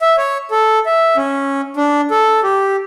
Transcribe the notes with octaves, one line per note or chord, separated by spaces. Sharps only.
E5
C#5
A4
E5
C#4
D4
A4
G4